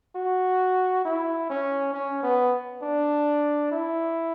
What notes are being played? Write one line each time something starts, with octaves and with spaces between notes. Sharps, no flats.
F#4
E4
C#4
C#4
B3
D4
E4